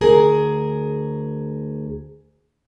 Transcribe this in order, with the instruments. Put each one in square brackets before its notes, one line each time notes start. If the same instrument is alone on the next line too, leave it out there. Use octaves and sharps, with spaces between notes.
[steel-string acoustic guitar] D2 G#4 A#4